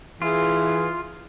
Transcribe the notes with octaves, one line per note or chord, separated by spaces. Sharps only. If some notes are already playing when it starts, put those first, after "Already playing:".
E3 F4 G#4